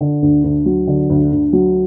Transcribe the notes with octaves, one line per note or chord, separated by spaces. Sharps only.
D3
D2
D2
F#3
D3
D2
D2
F#3